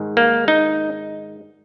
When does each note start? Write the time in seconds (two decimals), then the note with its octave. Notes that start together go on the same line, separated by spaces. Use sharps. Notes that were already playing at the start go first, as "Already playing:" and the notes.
Already playing: G#2 D#3
0.17 A#3
0.48 D#4